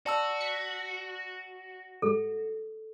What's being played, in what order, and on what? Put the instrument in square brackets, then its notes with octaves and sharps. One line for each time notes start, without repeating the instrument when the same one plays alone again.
[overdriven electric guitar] F#4 [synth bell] D5 A5 E6
[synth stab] B6 C#7
[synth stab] G#2 G3 G#3 [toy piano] A4